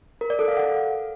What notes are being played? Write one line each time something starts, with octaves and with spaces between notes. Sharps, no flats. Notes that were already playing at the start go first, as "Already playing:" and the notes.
A#4
D5
A4
F5
F#5